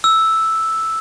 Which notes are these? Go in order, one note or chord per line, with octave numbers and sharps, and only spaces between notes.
E6